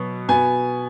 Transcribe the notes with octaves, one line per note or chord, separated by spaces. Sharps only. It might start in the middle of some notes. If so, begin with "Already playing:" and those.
Already playing: B2 F#3 B3
B2 B3 G#5